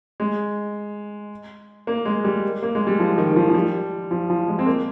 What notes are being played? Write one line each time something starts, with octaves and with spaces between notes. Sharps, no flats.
G#3
A#3
G#3
G3
A#3
G#3
G3
F3
D#3
D#3
F3
F3
G3
F3
F3
G#3
C4
A#3